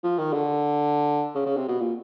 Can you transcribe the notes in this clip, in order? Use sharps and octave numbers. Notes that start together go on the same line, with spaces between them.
F3
D#3
D3
C#3
C#3
C3
B2
A#2